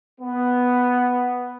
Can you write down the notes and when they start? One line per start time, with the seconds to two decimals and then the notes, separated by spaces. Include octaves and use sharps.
0.20 B3